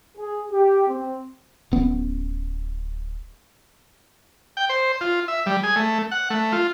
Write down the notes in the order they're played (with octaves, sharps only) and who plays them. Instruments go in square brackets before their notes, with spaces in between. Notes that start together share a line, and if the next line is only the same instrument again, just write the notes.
[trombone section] G#4
G4
C4
[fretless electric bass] D1 B3 C#4
[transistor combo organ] G5
C5
F4
E5
G3
G#4
A3
F#5
A3
F4